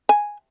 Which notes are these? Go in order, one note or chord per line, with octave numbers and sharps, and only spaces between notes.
G#5